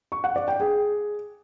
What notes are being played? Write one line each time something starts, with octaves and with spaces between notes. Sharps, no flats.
C#6
F#5
D5
G5
G#4